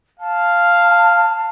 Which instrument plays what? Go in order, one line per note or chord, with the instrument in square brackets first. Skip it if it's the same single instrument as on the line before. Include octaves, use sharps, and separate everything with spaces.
[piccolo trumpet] F5 [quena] A5